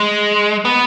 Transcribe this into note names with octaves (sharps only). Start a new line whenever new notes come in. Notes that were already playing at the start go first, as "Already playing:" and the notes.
Already playing: G#3
B3